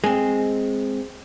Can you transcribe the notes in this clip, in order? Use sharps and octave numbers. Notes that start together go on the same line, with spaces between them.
G#3 C4